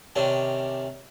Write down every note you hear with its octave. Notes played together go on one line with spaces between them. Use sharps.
C3 D#3 C#4 D4